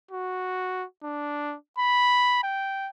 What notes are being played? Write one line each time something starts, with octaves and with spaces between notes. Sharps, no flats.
F#4
D4
B5
G5